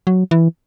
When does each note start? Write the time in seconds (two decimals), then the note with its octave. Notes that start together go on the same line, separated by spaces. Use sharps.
0.07 F#3
0.31 E3